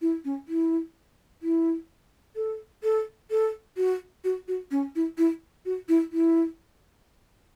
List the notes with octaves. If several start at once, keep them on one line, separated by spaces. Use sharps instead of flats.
E4
C#4
E4
E4
A4
A4
A4
F#4
F#4
F#4
C#4
E4
E4
F#4
E4
E4